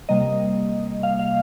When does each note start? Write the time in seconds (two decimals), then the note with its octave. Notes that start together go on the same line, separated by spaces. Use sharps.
0.09 C3 G3 A#3 D#5
1.03 F5
1.19 F5